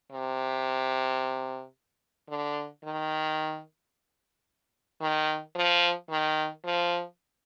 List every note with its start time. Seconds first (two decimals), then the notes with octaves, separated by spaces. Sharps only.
0.12 C3
2.29 D3
2.84 D#3
5.01 D#3
5.56 F3
6.10 D#3
6.65 F3